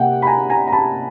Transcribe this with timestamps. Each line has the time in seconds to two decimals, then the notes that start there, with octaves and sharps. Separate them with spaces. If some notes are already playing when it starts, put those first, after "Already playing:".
Already playing: C3 A#3 F#5 G5
0.22 B5
0.27 G#5 A#5
0.50 G#5 A#5
0.68 A#5
0.72 A5 B5